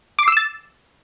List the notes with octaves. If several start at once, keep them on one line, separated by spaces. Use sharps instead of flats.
D6 E6 A6 C7 E7